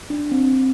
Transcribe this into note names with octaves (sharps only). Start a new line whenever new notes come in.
D4
C4